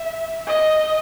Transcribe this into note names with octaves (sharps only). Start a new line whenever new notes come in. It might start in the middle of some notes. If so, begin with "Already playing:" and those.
Already playing: E5
D#5